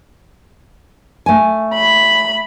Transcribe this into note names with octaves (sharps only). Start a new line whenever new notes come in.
A3 G#5
B5